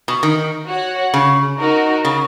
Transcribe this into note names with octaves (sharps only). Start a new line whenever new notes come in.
B2
D#3
F#4 C#5 F#5
C#3
D#4 F#4 A#4
C#3